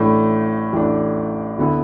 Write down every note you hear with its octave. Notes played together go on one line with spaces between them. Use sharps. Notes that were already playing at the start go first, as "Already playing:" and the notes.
Already playing: A1 A2 A3 D4
A1 A2 A3 D4
D2 D3 B3 E4 A4